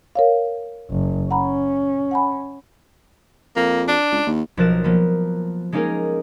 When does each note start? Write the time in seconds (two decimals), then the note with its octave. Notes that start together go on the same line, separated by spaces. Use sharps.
0.15 A#4 C#5 F5
0.90 F#1
1.31 C#4 F#5 A#5 B5
2.11 F#5 G#5 B5
3.56 F2 A#3
3.88 D4
4.12 C#2
4.26 D#2
4.57 B1 F3 A#4 F#6 A6 E7
4.84 F3 A#3 B3
5.72 G#3 A#3 C#4 D#4 G#4 A#4